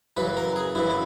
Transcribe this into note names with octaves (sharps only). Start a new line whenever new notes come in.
F#2 C#3 E3 B4
A#4
G#4
F#2 C#3 E3 E4
E4